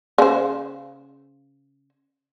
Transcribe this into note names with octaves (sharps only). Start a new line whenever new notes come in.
C#3 C5